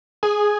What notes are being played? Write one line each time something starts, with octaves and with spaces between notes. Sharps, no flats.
G#4